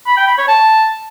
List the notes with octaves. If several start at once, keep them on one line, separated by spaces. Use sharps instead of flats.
B5
G5
B5
C#5
A5